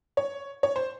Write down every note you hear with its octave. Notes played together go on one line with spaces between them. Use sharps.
C#5
C#5
C5